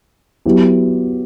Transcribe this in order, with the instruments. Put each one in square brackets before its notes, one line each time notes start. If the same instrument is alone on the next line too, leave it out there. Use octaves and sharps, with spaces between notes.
[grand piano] F#3 B3 E4 G4